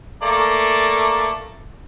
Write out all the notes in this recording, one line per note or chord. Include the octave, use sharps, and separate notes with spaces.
A3 A#3 D5